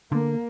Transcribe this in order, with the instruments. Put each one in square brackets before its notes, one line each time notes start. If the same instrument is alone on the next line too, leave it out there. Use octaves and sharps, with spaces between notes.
[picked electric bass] D3 [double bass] A#3